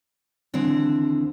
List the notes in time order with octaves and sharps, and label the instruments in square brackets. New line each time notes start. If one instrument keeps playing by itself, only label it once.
[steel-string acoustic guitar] D#2 D3 E3 C4